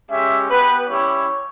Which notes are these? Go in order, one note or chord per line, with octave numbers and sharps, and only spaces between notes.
G#3 C#4 G4 E5
B3 G4 B4
G3 C#4 E4 G4 C#5